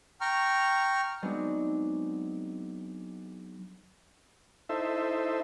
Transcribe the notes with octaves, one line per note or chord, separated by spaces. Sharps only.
G5 A#5 C#6 F6
F#3 G#3 B3 C4 D4 D#4
D#4 E4 A4 C5 E5